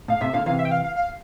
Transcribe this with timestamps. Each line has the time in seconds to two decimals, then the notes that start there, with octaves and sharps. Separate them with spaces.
0.08 A2 F5
0.21 A2 C3 E5
0.33 A#2 D3 F5
0.46 C3 E3 F5
0.59 E5
0.65 G5
0.71 F5
0.84 F5
0.96 F5